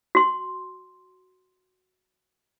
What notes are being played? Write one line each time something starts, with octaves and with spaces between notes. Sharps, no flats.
F#4 C6